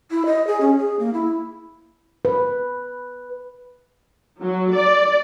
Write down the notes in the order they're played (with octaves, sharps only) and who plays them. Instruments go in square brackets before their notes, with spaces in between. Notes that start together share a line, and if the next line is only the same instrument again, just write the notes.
[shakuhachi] E4
D#5
G#4
C#4
G#4
A#3
E4
[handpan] B4
[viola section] F#3
D5